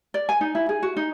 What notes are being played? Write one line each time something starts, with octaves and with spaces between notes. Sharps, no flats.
D5
G#5
D#4
E4
G#4
F#4
D#4